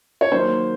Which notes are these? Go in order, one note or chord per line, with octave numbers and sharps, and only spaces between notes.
C#5
D#3 F#3 A#3 C5